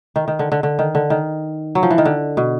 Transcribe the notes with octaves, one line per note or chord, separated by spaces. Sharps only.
D#3
D#3
D3
D3
D3
D#3
D3
D#3
F#3
F3
E3
D#3
D3
B2